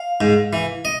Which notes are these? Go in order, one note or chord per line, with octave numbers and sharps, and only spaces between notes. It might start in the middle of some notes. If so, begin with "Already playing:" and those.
Already playing: F5
G#2
E3
D#5